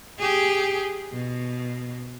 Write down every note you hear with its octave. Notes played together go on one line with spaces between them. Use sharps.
G4 G#4
B2